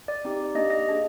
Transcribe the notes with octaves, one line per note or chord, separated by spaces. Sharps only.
D5
C4 D#4 G4
A#3 D4 G4 D#5
D#5
A#3 D4 G#4